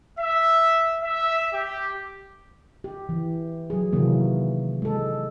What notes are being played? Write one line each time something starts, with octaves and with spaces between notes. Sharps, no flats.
E5
E5
G4
G4
E3
F#3 G#4
C3 D#3 E3 F#3 A#3
G#3 A4